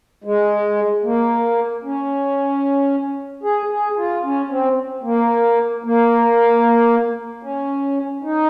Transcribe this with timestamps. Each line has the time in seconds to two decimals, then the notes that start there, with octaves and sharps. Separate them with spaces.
0.24 G#3
1.04 A#3
1.84 C#4
3.43 G#4
3.70 G#4
3.97 F4
4.23 C#4
4.50 C4
5.03 A#3
5.84 A#3
7.43 C#4
8.23 D#4